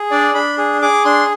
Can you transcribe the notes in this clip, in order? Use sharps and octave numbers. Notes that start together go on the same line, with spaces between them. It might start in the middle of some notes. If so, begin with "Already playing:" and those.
Already playing: G#4
D4 D5
D4 B5
G#4
G#4 D6
D4 C6